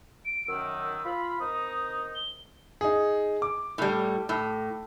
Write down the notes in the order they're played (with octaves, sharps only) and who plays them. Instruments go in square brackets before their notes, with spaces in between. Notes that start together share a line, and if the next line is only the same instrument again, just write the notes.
[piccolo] D7
[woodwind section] F#2 D#3 [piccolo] E6
[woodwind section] F4 B5
[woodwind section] D#3 C4 D#4 [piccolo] D#6
[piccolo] G7
[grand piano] D#4 G#4
D6
[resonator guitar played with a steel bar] A2 G3
A2